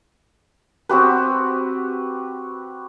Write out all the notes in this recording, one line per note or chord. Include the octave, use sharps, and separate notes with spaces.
C4 F#4 G4 B4